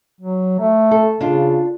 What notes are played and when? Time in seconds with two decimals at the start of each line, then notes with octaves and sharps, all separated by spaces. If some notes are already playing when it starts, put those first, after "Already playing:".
0.21 F#3
0.59 A3
0.91 A4
1.21 C#3 D4 F4